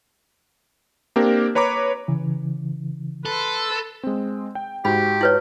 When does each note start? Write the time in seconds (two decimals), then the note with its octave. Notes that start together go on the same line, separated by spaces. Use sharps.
1.16 A#3 C4 D4 G4 A#4
1.55 B4 C#5 A#5 B5 D6
2.08 C#3 E3
3.26 A4 B4 C6
4.03 G#3 C4
4.55 G5
4.85 G#2 F#4 G4 B5
5.21 E4 B4 C#5